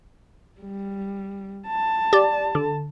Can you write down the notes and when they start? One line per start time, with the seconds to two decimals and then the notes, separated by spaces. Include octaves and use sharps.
0.61 G3
1.68 A5
2.13 G4 D5
2.55 D3